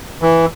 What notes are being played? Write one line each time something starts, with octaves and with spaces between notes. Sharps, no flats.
E3